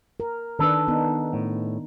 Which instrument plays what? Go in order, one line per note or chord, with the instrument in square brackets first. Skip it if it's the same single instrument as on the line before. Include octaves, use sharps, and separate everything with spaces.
[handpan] A#4
[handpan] D#3 D4 B4 [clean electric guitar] A4
[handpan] B3 D#4
[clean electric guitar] A2